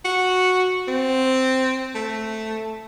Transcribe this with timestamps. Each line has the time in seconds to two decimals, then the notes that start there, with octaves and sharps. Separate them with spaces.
0.05 F#4
0.88 C4
1.95 A3